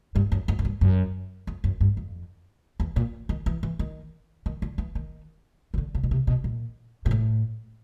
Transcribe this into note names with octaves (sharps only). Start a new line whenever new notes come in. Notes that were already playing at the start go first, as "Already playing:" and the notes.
G2
F#2
F2
F#2
G2
F#2
F2
F#2
G2
F2
E2
A#2
D#3
E3
E3
D#3
D#3
D3
E3
D#3
C#3
D3
C#3
B2
C3
B2
A#2
A#2
A2